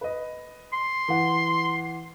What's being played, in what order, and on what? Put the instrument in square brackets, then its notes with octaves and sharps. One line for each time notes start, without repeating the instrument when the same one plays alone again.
[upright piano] B4 D#5
[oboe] C6
[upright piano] E3 F#5